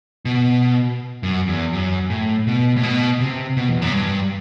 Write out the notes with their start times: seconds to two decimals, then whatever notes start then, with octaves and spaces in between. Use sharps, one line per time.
0.25 B2
1.23 F#2
1.48 E2
1.73 F#2
2.10 A2
2.47 B2
2.76 A2
2.83 B2
3.20 C3
3.57 B2
3.69 E2
3.82 F#2
3.94 G2